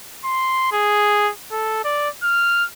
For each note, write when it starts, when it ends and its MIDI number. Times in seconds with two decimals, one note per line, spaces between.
0.25 0.70 84
0.72 1.31 68
1.52 1.83 69
1.84 2.09 74
2.23 2.65 89